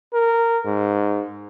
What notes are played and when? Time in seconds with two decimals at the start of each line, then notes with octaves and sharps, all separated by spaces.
0.14 A#4
0.66 G#2